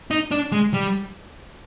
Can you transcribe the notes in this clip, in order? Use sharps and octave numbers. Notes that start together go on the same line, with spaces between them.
D#4
D4
G#3
G3